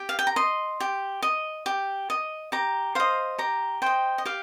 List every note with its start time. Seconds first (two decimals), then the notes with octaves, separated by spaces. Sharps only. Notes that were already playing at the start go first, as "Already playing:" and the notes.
Already playing: G4
0.09 F5
0.19 G5
0.27 A#5
0.36 D#5 C6
0.80 G4
1.22 D#5
1.66 G4
2.10 D#5
2.52 G4 A#5
2.95 C5 D#5 F5
3.38 G4 A#5
3.82 C5 D#5 G5
4.18 D#5
4.25 G4 F5